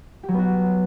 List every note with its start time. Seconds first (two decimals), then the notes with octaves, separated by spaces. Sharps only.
0.23 G4
0.28 F#3
0.34 B3
0.39 F#4